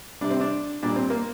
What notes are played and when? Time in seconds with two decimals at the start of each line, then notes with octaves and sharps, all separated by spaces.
0.21 C3 G3 D4
0.30 C4
0.40 D4
0.83 A#2 G3 D4
0.96 C4
1.10 A#3